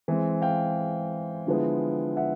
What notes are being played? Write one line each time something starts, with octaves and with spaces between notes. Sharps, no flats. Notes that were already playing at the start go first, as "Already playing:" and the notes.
E3 G#3 C4
F5 G5
D3 F3 G#3 B3 E4
E5 F#5